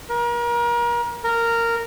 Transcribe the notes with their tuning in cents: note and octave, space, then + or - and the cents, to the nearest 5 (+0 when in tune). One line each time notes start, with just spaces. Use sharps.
A#4 +35
A#4 -10